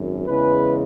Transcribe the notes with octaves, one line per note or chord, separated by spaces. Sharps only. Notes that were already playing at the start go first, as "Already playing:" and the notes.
Already playing: G#1 F#2
E2 C#3 E3 G#3 B4